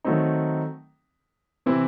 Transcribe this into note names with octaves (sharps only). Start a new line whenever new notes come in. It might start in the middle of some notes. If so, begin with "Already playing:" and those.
D#3 F#3 A3 C4 D#4
C3 E3 C4 E4